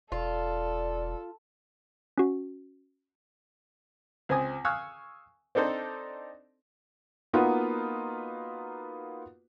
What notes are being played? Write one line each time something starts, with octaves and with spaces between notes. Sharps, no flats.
E1 F4 A4 D5
C#4 F#4
C#2 C4 G#5 D#6
F5 G#5 C#6 D#6 E6 F#6
C4 D4 D#4 A4 C5
A#3 B3 D#4 F4 F#4 B4